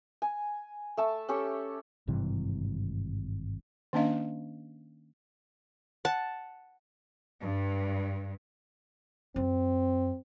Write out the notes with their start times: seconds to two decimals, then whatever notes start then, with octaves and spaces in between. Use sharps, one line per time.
0.22 G#5
0.97 A3 E5 A5
1.29 C#4 G4 A4 C#5
2.08 G#1 G2 C3 E3
3.93 D#3 A#3 C#4 D4 D#5 F5
6.05 F#5 A5
7.41 G2
9.36 F#2 C4